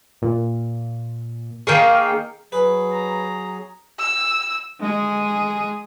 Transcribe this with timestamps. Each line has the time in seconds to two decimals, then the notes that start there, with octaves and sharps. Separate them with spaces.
0.22 A#2
1.67 D#3 A#3 G#4 F5 G5 C#6
2.52 F#3 G#4 B4
2.93 A#5
4.00 E6
4.80 G#3 G#4